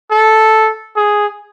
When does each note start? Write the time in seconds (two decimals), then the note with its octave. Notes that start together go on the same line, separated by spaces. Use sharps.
0.11 A4
0.96 G#4